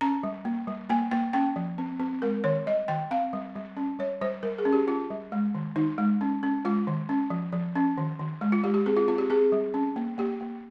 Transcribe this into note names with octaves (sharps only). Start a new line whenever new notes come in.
C#4 A#5
G3
A#3
G3
A#3 G#5
A#3 G5
C#4 G5
F3
C4
C4
G#3 A#4
D#3 C#5
G3 D#5
D#3 G5
C4 F5
G3
G3
C#4
G3 C#5
G3 C5
G3 A#4
G#4
C#4
G4
C#4 F4
G3
G#3
D#3
D#3 D#4
G#3
C#4
C#4
G#3 F4
D#3
C#4
F3
F3
C#4
D#3
D#3
G#3
F4
G#3 G4
G4
C4 G#4
F4
C4 F4
G4
C4 G#4
G3
C#4
A#3
A#3 G4
A#3